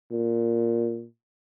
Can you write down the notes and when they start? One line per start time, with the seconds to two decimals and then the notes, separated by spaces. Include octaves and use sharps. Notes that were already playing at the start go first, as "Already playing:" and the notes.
0.12 A#2